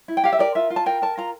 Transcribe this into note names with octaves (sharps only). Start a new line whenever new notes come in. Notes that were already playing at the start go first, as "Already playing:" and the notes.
E4
G5
G4 F5
E5
A#4 D5
F4 E5
F4
A5
A#4 G5
A#4 A5
F4 A#5